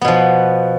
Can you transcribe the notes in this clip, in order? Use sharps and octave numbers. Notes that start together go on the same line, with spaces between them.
B2 F3 B3